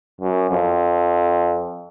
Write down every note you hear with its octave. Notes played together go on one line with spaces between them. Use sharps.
F#2
F2